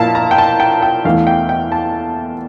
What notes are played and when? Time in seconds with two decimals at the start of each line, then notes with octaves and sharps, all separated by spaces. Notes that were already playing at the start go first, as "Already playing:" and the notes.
Already playing: A#2 F3 A#3 E4 F5 A5
0.15 A#5
0.31 G5
0.38 A5
0.60 G5
0.82 G5
1.05 E2 E3 A3 F5
1.27 G5
1.49 G5
1.72 A5